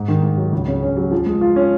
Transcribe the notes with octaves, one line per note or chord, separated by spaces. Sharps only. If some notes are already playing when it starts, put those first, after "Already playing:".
Already playing: G#2
D#3
G#2
F#3
C#2
C#3
C#4
F#3
F3
G#3
F4
C#4